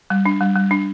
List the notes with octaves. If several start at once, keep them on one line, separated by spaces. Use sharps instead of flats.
G3
D4
G3
G3
D4